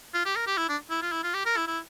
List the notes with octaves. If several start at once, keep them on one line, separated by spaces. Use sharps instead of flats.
F4
G4
A#4
G4
E4
D4
E4
F4
E4
F4
G4
A#4
E4
E4